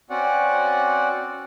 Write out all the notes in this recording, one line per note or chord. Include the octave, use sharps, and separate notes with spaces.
C4 C#4 F#4 D5 F#5